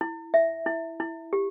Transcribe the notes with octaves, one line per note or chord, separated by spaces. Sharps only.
E4
E5
E4
E4
G4